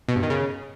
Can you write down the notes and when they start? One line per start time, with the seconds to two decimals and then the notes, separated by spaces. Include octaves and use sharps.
0.08 B2
0.16 G2
0.23 D#3
0.30 C#3